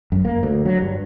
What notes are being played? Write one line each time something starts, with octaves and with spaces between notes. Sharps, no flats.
F#2
A#3
D2
F#3
G2